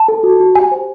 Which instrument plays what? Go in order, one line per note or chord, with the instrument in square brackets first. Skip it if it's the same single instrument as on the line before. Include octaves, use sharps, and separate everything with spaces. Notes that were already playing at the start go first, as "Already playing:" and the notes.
Already playing: [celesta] A5
A4
F#4
F#4
G4 G#5
C5